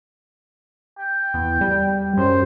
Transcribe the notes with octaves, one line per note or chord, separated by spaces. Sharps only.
G5
E2
G3
F#2 C5